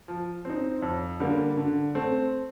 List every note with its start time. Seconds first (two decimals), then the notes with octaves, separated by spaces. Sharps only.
0.08 F3
0.45 C4 D#4
0.82 F2
1.20 D3 G3 A#3
1.57 D3
1.95 A3 C4